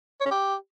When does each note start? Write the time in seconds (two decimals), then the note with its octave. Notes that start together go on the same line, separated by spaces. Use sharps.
0.21 C#5
0.26 C#4
0.31 G4